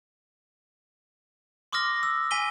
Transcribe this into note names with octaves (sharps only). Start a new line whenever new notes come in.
C6 D6 D#6 F6 A#6
E6
G#5 B6 D#7 G7